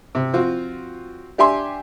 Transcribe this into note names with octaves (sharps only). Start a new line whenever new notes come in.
C3
F3 C4 F4 F#4
D4 G4 E5 G#5 C6